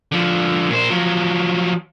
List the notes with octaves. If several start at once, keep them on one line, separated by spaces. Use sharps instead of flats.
D3 F3
A#2 C5
F3 F#3